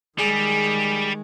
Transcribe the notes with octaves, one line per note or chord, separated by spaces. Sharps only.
D#3 G3 G#3 G#4